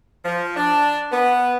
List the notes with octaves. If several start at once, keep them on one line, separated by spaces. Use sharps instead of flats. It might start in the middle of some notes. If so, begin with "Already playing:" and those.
F3
D4
B3